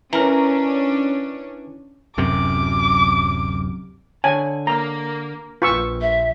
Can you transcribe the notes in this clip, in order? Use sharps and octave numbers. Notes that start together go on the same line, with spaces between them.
E3 C#4 D4 A#4 A#5
D1 F#2 C3 D6
D3 C#5 G#5 A5
A#3 A#5
A#1 F4 B4 C#6 E6
E5